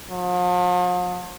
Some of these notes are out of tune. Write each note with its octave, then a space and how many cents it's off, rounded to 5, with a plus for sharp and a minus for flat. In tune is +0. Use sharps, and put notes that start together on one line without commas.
F3 +45